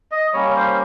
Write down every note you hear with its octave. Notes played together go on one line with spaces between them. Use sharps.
D#5
G3 A#3 C#4 C#5
C5